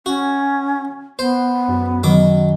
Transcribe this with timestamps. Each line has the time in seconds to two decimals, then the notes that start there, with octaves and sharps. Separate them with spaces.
0.06 C#4 F#4
1.19 B3 C5
1.68 F#2
2.04 D#3 F#3 D6